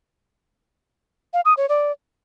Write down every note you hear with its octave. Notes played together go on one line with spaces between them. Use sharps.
F5
D#6
C#5
D5